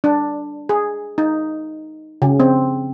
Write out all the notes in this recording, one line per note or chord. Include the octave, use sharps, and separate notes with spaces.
D4
G#4
D#4
C#3
C4